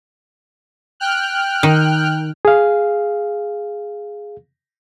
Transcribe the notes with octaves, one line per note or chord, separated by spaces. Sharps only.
G5 F6 F#6
D#3
G#4 F5